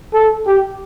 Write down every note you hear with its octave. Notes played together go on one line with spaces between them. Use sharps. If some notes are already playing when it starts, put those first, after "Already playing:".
A4
G4